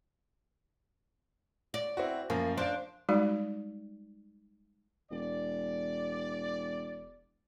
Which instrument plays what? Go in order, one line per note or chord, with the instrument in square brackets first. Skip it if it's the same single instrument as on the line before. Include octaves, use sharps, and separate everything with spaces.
[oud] D5
[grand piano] C4 E4 F#4
[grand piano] F#2 F3 [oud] A#3
[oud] D4 [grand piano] C5 F5
[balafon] G3 G#3 D#4 F#4 D5
[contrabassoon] E1 [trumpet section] D5